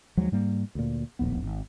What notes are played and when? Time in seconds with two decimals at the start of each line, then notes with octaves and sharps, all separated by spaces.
0.17 D#2 F3 F#3 G#3
0.32 G#2 G3 A#3
0.75 D2 A#2
1.19 D1 A#1 D#2 B3
1.43 G#1